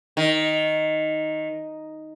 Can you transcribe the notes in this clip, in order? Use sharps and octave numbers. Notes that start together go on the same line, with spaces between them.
D#3